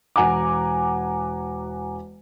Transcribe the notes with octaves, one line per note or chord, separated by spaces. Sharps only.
E1 F#5 G#5 A#5 D6